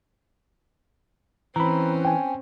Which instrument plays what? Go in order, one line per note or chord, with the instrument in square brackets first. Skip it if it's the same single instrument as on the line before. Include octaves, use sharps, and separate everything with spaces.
[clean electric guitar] E3 [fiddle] C4 C#4 [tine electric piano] A#5 B5
[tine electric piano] G5 G#5